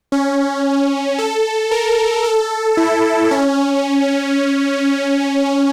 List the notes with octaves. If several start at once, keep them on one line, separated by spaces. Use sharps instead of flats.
C#4
A4
A#4
A4
E4
C#4